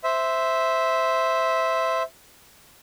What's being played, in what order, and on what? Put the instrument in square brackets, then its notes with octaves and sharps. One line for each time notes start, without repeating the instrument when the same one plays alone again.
[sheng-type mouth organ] C5 E5